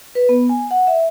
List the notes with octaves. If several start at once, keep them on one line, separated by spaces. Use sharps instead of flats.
B4
B3
G#5
F#5
E5